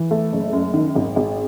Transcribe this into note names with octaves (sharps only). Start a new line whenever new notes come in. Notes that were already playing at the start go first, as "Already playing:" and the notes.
Already playing: E3
A3
F#1
F#2
D#3
G#1
G#1